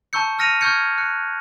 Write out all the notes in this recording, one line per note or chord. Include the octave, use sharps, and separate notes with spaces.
A5 A#5 C#6 E6 G6 C#7
E6 F6 A#6 C#7 D#7 F7
C#6 E6 F6 G6 G#6 C#7
F#6 C#7